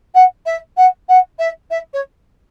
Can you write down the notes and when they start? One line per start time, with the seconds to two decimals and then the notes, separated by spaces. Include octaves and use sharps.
0.14 F#5
0.45 E5
0.77 F#5
1.08 F#5
1.39 E5
1.70 E5
1.93 C#5